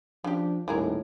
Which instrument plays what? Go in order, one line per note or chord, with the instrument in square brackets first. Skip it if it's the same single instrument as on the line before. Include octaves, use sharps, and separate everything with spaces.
[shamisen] C#3 G4 [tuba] F3 [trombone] D4
[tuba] D#1 [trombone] A2 [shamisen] E3 G#4 A#4